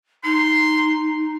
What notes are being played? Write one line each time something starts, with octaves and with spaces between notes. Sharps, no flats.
D#4 C6